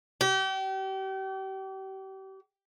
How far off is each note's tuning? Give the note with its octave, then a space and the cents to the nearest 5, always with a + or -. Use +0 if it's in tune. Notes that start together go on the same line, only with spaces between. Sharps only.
G4 -35